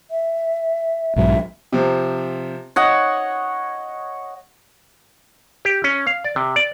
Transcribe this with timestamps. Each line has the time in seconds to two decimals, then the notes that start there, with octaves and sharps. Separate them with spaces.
0.10 E5
1.16 B1 G#2 F#3 E5
1.72 C3 F3
2.76 D#4 C#5 D#5 F#5
5.65 G4
5.84 C#4
6.07 F5
6.24 D5
6.36 C3
6.56 D5